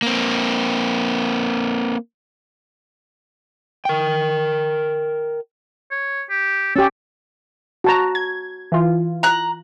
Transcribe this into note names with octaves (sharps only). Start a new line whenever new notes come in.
A#3 C4
A#4 G5
C#5
G4
C#4 G4 A4
F#4 A5 A#5
G#6
E3 F4
A#5 F#6